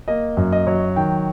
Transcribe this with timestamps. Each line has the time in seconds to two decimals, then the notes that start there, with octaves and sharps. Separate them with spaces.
0.08 A#3 D#5
0.37 F#2
0.52 D#5
0.67 F#3
0.96 D#3 G5